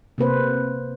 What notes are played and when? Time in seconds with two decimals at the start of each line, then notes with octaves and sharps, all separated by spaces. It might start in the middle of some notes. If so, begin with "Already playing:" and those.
0.18 C3 A#3 B4 C5